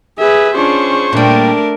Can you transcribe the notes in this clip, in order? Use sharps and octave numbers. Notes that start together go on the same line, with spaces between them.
G#4 B4 E5
C#4 D4 F4 G#4 C5 C#6
A#2 G3 A3 D4 A#4